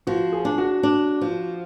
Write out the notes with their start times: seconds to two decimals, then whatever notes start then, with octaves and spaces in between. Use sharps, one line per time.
0.07 F3 F#4
0.32 G#4
0.45 D4
0.58 F#4
0.83 D4
1.21 F3